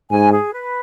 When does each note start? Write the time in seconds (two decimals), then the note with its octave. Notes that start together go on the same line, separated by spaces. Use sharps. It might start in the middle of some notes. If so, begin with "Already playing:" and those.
0.11 G#2 G#5
0.32 G#4
0.53 B4